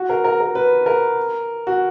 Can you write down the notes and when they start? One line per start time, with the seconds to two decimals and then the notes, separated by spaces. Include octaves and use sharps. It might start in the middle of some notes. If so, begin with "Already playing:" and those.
Already playing: F#4
0.09 A#4
0.24 A#4
0.40 A#4
0.55 B4
0.86 A#4
1.67 F#4